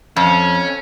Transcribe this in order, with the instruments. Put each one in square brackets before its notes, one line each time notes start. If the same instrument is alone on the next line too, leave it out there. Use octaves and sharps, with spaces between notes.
[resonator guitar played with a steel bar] F2 [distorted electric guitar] C#4